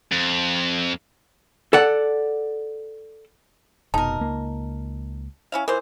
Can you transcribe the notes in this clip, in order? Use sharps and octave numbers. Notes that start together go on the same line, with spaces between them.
F2
A4 D5 F#5
F1 B2 D#4 A#4 A5
C#2 A#3
C#4 E4 F5
E3 A#4 C5